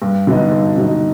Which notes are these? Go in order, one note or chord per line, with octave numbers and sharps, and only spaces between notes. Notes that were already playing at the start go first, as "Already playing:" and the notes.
G2
D3 F#3 B3 D#4
G2
D3 F#3 B3 D#4